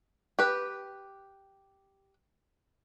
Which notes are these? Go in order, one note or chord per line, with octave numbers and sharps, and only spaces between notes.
G4 B4